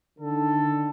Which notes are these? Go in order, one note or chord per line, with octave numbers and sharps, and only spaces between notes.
D3 D#3 A4